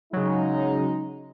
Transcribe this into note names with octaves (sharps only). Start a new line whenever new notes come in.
C#3 F#3 G#3 D#4